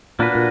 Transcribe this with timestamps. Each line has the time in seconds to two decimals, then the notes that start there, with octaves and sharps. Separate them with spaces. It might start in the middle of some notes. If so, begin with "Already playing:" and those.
0.19 A#2 A#3 D4 F#4 B4
0.35 A#2